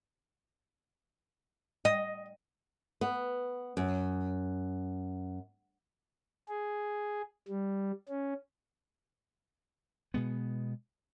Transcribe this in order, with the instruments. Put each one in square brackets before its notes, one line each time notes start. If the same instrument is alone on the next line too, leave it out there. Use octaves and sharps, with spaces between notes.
[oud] D#5
[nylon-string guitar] B3
F#2
[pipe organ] G#4
G3
C#4
[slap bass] B2 G#3 B3